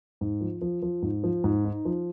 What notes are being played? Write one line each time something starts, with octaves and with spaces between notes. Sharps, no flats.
G#2
F3
F3
F3
G#2
F3
G#2
D#4
F3